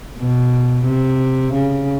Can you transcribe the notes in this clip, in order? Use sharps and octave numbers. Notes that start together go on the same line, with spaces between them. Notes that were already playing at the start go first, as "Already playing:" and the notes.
B2
C3
C#3